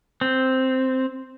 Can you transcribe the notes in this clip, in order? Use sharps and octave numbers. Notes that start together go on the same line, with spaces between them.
C4